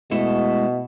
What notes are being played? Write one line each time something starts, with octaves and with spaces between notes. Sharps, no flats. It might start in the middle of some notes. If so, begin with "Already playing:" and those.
B2 G#3 A3 E4